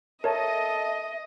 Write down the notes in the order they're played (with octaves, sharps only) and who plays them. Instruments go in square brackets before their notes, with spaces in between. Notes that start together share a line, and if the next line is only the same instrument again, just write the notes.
[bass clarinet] A4 [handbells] A#4 C#5 A5 [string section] D#5 [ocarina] E5